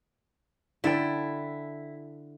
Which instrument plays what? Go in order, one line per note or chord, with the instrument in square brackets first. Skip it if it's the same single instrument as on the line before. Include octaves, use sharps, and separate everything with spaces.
[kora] D3 A4 G5 [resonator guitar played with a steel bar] E4